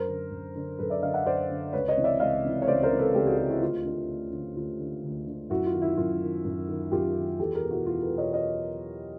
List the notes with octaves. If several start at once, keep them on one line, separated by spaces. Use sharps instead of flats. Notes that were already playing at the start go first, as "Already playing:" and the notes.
Already playing: F#2 A#4 C5
D3
F#2
D3
F#2 A4 B4
D5 E5
D3 D#5 F5
E5 F#5
F#2 C5 D5
D3
C#2 B4 C#5
C#5 D#5
C3 E3
D5 E5
C#2 D#5 F5
C3 E3
C#5
C#2 C5 D5
A#4 C5
C3 E3
A4 B4
C#2 G4 A4
F#4 G#4
C3 E3 F#4 G#4
E4 F#4
D2 F4
D3
D2
D3
D2 F4
D3
D2
D3
F#2 E4 F#4
F4
D#3
E4
F#2 F4
D#3
F#2
D#3
F#2 F4 G4
D#3
E2 G4 A4
G#4 A#4
B2
E4 F#4
E2 F4
A4 B4
B2
C#5 D#5
C#5 D#5